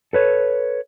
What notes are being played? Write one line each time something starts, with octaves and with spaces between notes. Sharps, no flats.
A4 B4 C#5